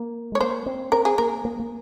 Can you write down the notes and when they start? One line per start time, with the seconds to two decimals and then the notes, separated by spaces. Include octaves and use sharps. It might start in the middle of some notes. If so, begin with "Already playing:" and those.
Already playing: A#3
0.32 G#3 C#5
0.40 A#3 C5
0.66 C4
0.92 C4 A#4
1.05 G#4
1.18 A#3 A#4
1.45 A#3
1.60 A#3